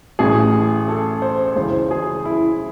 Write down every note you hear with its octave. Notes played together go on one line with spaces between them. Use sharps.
A1 A2 E3 G#4
A4
C5
C#2 C#3 E3 C5
G#4
E4